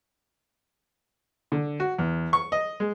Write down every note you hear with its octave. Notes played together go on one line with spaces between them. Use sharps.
D3
F#4
E2
C#6
D#5
G#3